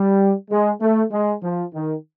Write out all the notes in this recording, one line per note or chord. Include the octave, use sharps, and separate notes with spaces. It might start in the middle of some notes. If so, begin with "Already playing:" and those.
Already playing: G3
G#3
A3
G#3
F3
D#3